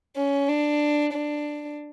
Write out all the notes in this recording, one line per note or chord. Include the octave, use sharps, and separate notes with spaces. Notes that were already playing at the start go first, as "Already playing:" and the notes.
C#4
D4
D4